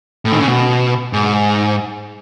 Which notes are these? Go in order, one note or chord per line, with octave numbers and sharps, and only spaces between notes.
A2
D#3
C#3
B2
G#2